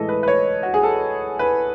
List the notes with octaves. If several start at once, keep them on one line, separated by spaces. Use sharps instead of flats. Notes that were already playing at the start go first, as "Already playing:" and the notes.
Already playing: A2 E3 G#3 A4 D#5
B4
B4
C#5
F#4
G#4
A4
B4